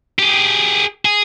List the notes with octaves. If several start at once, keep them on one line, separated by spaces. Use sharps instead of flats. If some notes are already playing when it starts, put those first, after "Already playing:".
G4 G#4
G#4